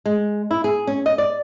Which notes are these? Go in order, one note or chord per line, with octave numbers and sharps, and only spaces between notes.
G#3
E4
G#4
C#4
D#5
D5